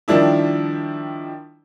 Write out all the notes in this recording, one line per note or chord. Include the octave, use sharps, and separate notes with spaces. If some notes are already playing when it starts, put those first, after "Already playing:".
D#3 F3 G3 D4 E4